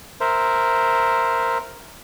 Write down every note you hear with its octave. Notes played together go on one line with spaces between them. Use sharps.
A#4 C5 E5